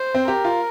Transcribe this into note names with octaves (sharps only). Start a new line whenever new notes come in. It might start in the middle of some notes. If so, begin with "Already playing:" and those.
Already playing: C5
C4
G4 A#4
F4